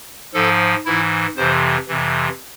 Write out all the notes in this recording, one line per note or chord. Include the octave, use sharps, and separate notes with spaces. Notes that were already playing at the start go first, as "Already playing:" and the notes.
G#2 F3 A4
G#2 E3 E4
F2 C3 E3 C5
F2 C3 E3